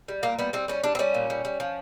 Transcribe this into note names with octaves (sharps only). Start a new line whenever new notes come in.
G3
A#2 A#3
G3 B3
G3 C4
G3 C#4
G3 D4
C4
G3 C#4
A#2
G3
G3
F3